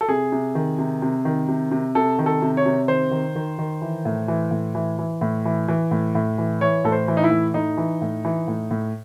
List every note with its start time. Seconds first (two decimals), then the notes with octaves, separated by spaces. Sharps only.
0.01 A4
0.09 C3 G#4
0.32 C3
0.55 D#3
0.78 C3
1.02 C3
1.25 D#3
1.48 C3
1.71 C3
1.95 C3 A4
2.19 D#3
2.26 A4
2.42 C3
2.57 C#5
2.66 C3
2.88 D#3 C5
3.11 D#3
3.36 D#3
3.59 D#3
3.82 E3
4.05 A2
4.28 E3
4.51 A2
4.75 E3
4.99 E3
5.21 A2
5.45 E3
5.68 E3
5.91 A2
6.15 A2
6.38 E3
6.61 E3 C#5
6.84 A2 A4
6.92 C5
7.08 E3
7.17 D#4
7.24 E4
7.31 A2
7.54 A2 D#4
7.77 E3
8.02 A2
8.25 E3
8.48 A2
8.71 A2